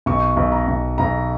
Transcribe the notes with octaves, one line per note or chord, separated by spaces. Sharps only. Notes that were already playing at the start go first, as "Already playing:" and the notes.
B1 C#6
B1
A#5
B1
B1 A#5